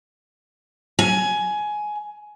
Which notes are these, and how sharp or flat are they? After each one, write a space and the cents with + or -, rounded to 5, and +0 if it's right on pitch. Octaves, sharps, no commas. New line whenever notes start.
G#5 +15